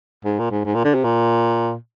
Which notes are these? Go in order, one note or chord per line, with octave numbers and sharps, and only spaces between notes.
G#2
A#2
G#2
G#2
A#2
D3
C3
A#2